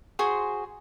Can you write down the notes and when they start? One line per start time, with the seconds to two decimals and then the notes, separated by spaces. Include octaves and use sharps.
0.19 F#4 G#4 C5 C6